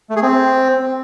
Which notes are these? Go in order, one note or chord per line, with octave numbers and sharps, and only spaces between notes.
A3
G#4
C4